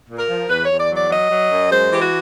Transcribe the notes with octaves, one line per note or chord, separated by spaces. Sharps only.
A#2
A#4
F3
E2 B4
E2 C#5
D5
F#3 D5
F#3 D#5
F#3
F#2
G#3 C5
E3 G4
F#4